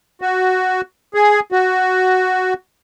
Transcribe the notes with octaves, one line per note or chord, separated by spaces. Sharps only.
F#4
G#4
F#4